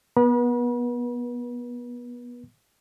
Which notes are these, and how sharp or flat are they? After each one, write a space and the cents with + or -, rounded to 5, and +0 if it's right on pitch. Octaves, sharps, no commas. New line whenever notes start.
B3 -20 B4 -35 B5 -40